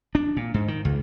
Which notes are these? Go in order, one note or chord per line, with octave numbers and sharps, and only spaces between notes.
D4
A#2
G#2
D#3
C#2